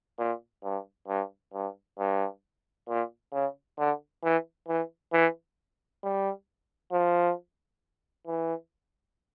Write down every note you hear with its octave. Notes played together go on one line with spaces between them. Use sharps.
A#2
G2
G2
G2
G2
A#2
C#3
D3
E3
E3
E3
G3
F3
E3